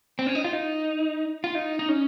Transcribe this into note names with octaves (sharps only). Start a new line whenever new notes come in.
C4
C#4
D#4
F4
D#4
F4
D#4
D#4
C#4